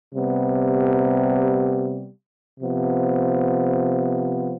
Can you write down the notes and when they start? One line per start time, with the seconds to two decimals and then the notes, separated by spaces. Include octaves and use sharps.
0.13 C3 G3 B3
2.59 C3 F3 B3